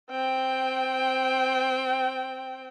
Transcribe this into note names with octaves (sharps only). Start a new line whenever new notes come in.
C4 G5